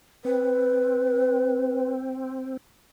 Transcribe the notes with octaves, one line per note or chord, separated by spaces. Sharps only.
C4 B4